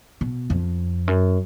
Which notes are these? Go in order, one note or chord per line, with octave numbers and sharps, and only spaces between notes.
B2
F2
F#2